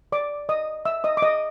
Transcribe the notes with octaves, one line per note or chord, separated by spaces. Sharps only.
D5 D6
D#5 D#6
E5 E6
D#5 D#6
D6
D#5 D#6